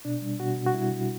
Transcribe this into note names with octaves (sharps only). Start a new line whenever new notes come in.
B2 D4
G3
B2 F#4
B2
F#4
G3 E4
B2